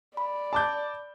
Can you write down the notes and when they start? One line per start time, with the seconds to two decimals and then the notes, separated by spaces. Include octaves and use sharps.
0.17 D5 B5
0.53 A5 D6 G6